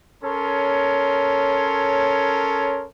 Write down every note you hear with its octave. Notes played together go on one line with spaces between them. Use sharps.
C#4 A4 A#4 C#5 C6